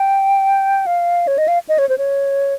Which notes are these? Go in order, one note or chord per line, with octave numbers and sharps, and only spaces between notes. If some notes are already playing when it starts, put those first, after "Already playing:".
Already playing: G5
F5
C#5
D#5
F5
D#5
C#5
C5
C#5